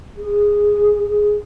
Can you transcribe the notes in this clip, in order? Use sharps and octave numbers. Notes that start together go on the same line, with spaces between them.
G#4
G#4